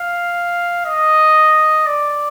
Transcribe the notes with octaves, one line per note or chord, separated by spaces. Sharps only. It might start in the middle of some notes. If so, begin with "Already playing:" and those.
Already playing: F5
D#5
D5